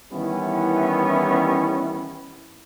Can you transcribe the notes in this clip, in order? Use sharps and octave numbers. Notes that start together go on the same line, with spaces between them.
D#3 E3 G3 B3 C#4 E4